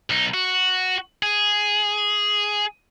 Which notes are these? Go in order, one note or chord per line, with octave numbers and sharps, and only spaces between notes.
B1 D#4
F#4
G#4